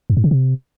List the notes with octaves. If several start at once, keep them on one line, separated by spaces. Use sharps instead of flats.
F#2
G#2
C#3
C3